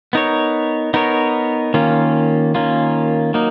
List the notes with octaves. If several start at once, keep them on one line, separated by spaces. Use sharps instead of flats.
B3 D#4 A#4 C#5
B3 D#4 A#4 C#5
D#3 A#3 C#4 F4
D#3 A#3 C#4 F4
F#3 A#3 D#4 A#4